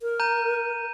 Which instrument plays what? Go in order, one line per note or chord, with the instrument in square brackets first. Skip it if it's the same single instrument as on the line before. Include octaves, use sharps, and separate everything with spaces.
[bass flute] A#4
[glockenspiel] A#5 G6 D#7